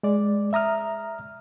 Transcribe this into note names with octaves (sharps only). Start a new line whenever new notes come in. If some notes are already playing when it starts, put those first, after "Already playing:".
G#3 D5
E5 A#5 D#6 F6